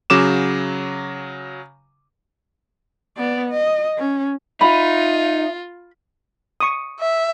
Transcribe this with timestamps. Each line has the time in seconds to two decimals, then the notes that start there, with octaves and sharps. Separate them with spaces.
0.10 C#3 F#3 D6 E7
3.17 B3 D5
3.50 D#5
3.98 C#4
4.61 D#4 F4 E5 B5
6.60 C#6 D#6
7.00 E5